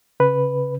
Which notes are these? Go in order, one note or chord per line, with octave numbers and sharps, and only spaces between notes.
C#3 B4